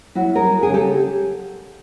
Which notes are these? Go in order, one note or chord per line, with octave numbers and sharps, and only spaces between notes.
F#3 E4 F#4
G#4 A#4
F#3
C#3 G#4
G4 A4